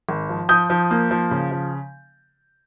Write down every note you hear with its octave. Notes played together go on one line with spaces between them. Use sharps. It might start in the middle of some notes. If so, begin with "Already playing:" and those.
G#1
F3
F3 D#6 G6
F3
A#3
F3
C#3
F3